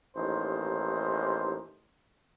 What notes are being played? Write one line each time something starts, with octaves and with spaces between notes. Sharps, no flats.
A1 D#2 D#4 C5